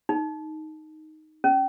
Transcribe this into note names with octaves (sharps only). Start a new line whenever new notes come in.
D#4
C#4